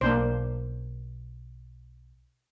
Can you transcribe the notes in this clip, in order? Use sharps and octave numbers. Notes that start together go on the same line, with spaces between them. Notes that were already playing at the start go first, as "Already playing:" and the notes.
B1 A#3 D4 C5